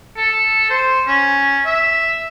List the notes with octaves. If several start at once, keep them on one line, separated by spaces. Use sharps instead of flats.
A4
C5
C#4
E5